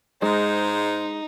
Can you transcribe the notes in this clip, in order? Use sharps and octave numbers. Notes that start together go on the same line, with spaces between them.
G#2 G#3 D#4 C5